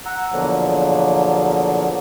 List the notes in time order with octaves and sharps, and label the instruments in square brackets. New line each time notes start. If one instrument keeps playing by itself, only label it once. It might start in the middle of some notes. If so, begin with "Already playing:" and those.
[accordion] F#5 A#5 E6
E2 B2 D3 F3 F#3 A#3